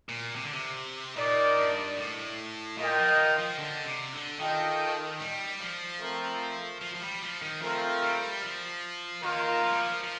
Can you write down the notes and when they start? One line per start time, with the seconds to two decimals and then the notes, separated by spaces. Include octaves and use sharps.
0.09 A#2
0.36 C3
0.44 D3
0.53 C3
1.16 A#2 D#4 A#4 D5
1.57 G2
1.97 A2
2.78 A#2 F4 A#4 D#5 G5
2.98 F3
3.19 D#3
3.38 F3
3.59 D3
3.85 C3
4.13 D3
4.39 D#3 F4 A4 D#5 G5
5.20 G3
5.60 F3
6.00 A3 C4 F4 A#4
6.81 F3
6.95 F3
7.01 G3
7.22 F3
7.42 D#3
7.61 F3 A3 C4 F4 A#4
8.02 G3
8.42 F3
9.23 D#3 A#3 F4 A#4
9.63 F3
9.71 G3
9.79 F3
10.04 F3